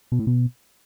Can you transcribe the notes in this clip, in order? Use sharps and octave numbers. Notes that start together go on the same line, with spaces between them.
B2
A2
B2